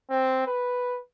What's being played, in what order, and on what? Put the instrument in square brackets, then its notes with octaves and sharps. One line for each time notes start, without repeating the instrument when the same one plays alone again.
[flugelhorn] C4
B4